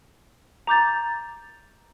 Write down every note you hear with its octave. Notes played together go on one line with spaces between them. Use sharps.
A#5 D6 G6 A6